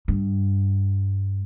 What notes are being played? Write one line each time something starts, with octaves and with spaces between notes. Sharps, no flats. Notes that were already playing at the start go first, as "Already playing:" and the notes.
G2